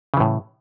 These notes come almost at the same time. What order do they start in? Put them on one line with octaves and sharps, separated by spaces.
C#3 E3 A2